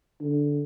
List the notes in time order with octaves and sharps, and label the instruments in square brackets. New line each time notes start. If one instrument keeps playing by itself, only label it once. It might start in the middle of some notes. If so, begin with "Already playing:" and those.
[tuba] D3